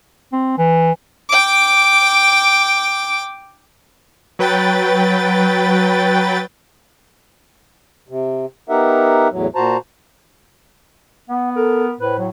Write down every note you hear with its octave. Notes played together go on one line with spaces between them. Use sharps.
C4
E3
G5 D6
F#3 B4 G5 A6
C3
B3 D#4 G4 A#4 E5 F#5
E2 A2 F#3
A#2 F#4 C5 A5 A#5
B3 F#5
A4 A#4
A2 B4 C5
A2 F#3